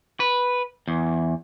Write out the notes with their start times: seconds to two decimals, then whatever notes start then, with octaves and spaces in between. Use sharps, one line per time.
0.20 B4
0.88 E2